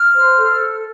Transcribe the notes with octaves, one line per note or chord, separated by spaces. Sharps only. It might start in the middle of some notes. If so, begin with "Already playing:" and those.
Already playing: F6
C5
A4